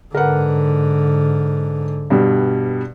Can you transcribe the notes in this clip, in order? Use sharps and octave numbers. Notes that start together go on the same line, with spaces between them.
G#2 D3 A#4 B4 F#5
G2 B2 G3